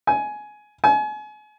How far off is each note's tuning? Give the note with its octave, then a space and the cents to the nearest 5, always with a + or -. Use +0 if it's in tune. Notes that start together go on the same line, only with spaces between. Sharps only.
G#5 +15
G#5 +35